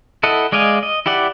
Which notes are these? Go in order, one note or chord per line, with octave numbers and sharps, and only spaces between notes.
E4 A4 D#5 F#5
G#3 D5 D#5 F5 G#5
D#5
E4 G4 D5 F#5